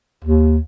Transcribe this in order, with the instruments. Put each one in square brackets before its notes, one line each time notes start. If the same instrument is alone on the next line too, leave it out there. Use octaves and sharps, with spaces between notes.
[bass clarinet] D#2